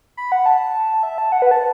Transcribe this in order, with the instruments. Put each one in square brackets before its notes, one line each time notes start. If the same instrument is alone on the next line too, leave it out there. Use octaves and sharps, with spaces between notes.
[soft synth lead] B5
F#5
A5
E5
A5
F#5
B4
A5